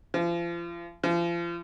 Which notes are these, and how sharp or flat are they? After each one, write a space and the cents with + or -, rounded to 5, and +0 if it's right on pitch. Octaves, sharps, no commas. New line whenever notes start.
F3 -35
F3 -35